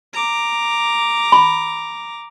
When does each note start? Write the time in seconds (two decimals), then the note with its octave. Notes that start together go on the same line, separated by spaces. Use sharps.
0.14 A#5 D6
1.32 B5